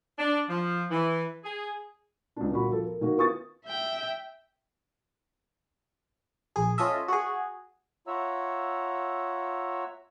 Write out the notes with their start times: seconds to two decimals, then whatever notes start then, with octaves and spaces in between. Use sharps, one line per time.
0.18 D4
0.49 F3
0.91 E3
1.44 G#4
2.36 C#2 D4
2.50 G1 A#2 F#4 B5
2.70 F3 A4
2.84 A#4
3.01 D#3 A#3 F#4 A#4
3.17 B3 E4 F4 C#6 D#6 A6
3.66 E5 G5
6.56 A#1 G#4
6.78 C#4 F4 A4 D#5 E5
7.08 F#4 G#4
8.07 F4 C#5 E5 F#5 A#5 E6